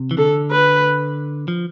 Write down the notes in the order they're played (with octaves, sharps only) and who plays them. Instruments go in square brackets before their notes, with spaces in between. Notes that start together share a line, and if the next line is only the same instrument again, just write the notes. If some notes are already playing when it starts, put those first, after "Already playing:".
Already playing: [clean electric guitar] C3
E3
[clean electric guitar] D3 [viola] A4
[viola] B4
[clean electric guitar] F3